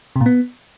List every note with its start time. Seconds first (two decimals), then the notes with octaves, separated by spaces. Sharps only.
0.16 C3
0.21 A#2
0.26 B3